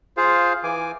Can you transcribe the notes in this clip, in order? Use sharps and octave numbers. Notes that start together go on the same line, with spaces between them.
F4 G#4 C5 F5
E3 G#5 D6